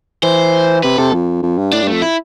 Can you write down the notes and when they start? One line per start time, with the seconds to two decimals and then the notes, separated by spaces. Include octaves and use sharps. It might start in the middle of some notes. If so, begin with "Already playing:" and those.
0.23 E3 C5
0.83 C3 B4
0.98 C3 A4
1.13 F2
1.43 F2
1.58 G2
1.72 A2 D4
1.82 G2 A3
1.93 F2
2.02 E4